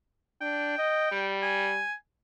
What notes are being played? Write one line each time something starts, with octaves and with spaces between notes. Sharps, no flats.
D4 G5
D#5
G3
G#5